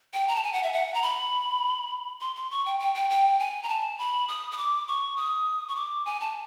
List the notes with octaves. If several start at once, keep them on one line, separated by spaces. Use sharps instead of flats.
G5
A#5
A5
G#5
F#5
E5
F#5
A#5
B5
C6
C6
C#6
G5
G5
G5
G5
G#5
A#5
A5
B5
D#6
D#6
D6
C#6
D#6
C#6
D6
G#5
A5